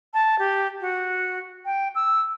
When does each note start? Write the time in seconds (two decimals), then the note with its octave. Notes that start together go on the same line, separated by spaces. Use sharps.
0.14 A5
0.39 G4
0.80 F#4
1.65 G5
1.95 E6